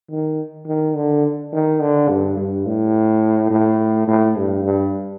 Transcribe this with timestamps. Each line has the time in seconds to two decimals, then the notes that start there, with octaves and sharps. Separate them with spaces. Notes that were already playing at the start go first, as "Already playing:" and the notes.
0.10 D#3
0.67 D#3
0.96 D3
1.52 D#3
1.81 D3
2.09 G2
2.37 G2
2.66 A2
3.51 A2
4.07 A2
4.36 G2
4.64 G2